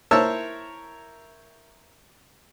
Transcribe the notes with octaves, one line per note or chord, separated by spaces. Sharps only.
E4 A#4 C5 C#5 A5 E6